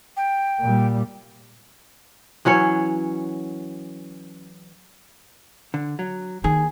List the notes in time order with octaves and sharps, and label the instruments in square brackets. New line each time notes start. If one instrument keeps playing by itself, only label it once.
[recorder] G5
[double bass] A#2 G3
[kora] E3 F#3 C#4 C#5
[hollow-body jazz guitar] D3
F#3
[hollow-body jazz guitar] D#2 G#4 [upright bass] D#3